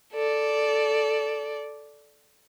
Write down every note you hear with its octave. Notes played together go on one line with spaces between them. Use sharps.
A4 D5